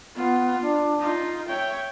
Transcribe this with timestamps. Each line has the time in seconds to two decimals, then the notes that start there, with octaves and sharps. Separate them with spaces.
0.15 B3 F4
0.61 D4
0.99 D#4 F4
1.47 C#5 E5 G5